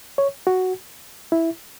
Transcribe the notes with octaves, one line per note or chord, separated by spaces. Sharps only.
C#5
F#4
E4